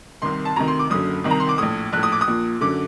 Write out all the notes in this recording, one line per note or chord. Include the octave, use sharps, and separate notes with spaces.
C2 C3 D#3 C6
A5
D2 C3 D#3 A#5
C6
D6
F#1 F#2 D3 D#6
C2 C3 D#3
A#5
C6
D6
A#1 A2 D#6
A#1 A2 F#6
D#6
D6
D#6
A#1 A#2
F#2 D3 D6